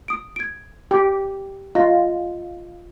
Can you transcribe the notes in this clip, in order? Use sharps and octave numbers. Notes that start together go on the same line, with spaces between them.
D#6 D7
G#6 D7
G4
F4 D#5 F5 A#6